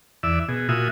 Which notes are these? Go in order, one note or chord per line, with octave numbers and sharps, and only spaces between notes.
E2 D5 E5 E6
B2 G#4
A#2 F4 F#4 E5 G#5 D#6